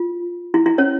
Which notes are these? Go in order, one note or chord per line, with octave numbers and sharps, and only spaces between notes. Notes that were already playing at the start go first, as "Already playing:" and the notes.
Already playing: F4
E4
E4
C#4 C#5